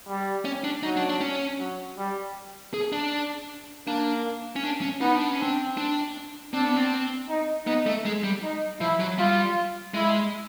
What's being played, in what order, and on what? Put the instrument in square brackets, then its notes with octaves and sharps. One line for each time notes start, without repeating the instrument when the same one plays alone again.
[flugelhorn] G3
[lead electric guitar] C#4
D4
[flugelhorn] F#3 [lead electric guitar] D#4
[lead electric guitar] D4
D4
C#4
[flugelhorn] F#3
G3
[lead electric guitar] G#4
D4
[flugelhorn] A#3 [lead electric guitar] D4
[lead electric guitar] C#4
D4
C#4
[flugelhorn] B3 [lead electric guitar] D#4
[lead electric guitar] D4
C#4
[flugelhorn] C4 [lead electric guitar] D4
[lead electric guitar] D4
[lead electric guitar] C4 [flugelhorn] D4
[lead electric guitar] B3
C4
[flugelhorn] D#4
[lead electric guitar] B3 [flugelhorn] D#4
[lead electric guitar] A3
G#3
G3
[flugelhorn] D#4
[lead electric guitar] F3 [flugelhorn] E4
[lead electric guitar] F#3
[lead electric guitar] G3 [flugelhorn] F4
[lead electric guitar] G#3 [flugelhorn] E4